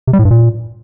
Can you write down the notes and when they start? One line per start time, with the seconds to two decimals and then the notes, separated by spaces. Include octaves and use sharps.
0.07 C3
0.13 G3
0.19 A2
0.25 G2
0.31 A#2